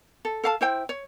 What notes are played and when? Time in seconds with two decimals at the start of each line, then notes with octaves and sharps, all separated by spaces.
0.25 A4
0.44 A4 F5 A5
0.61 E4 C5 G5
0.89 C#5